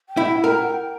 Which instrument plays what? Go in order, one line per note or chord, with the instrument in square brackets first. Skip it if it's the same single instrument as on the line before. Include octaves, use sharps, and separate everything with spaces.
[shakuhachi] G5
[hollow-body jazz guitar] E4
[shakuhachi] F#5
[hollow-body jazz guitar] A#4 [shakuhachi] G5
[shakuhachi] F#5
G5